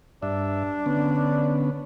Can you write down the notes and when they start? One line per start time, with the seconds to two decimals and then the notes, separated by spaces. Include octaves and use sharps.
0.22 G2 D4 E5
0.86 D3 B3 C#4